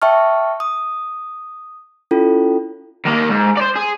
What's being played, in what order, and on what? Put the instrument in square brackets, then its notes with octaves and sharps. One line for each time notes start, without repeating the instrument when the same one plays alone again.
[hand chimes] E5 G5 A5 C#6 F6
D#6
C#4 E4 F4 A4
[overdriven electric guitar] D#3 A#3
G#2
C5 D5
G#4